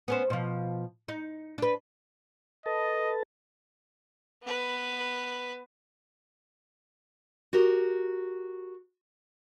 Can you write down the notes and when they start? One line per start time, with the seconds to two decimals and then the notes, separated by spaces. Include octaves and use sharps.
0.08 B3 C#4 C5
0.30 B2 F3
1.08 D#4
1.58 D4 B4
2.66 A4 B4 D#5 A5
4.43 B3 B4
7.53 F#4 G4 A#4